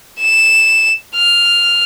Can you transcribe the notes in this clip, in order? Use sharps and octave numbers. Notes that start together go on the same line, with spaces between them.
E7
F6